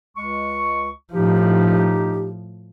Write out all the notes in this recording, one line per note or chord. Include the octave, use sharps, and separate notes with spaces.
C#2 G#3 C#6
A2 F3 D#4 G4